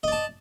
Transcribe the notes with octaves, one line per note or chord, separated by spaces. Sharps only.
D5 D#5 A5